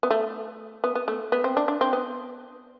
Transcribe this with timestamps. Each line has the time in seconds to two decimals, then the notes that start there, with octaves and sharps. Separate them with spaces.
0.03 B3
0.10 A3
0.84 B3
0.95 B3
1.08 A3
1.32 B3
1.44 C4
1.57 D4
1.68 D4
1.81 C4
1.93 B3